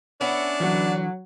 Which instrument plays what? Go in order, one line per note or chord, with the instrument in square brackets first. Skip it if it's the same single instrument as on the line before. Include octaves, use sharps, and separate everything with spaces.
[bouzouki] B3 C#4 E4 [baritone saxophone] D4
[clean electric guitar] D3 E3 [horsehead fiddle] F#3